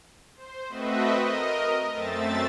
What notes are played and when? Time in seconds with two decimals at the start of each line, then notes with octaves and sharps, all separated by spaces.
0.36 C5
0.69 A3 C4 F#4 B4 D#5 E5
1.19 A#4 D#5
1.93 F#2 A3 C4 E5 A6